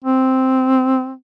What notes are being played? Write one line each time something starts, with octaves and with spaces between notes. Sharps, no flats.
C4